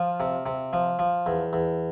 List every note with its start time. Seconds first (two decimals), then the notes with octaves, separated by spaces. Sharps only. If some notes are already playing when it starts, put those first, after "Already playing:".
Already playing: F3 F4
0.20 C3
0.46 C3
0.73 F3
0.99 F3
1.26 E2
1.53 E2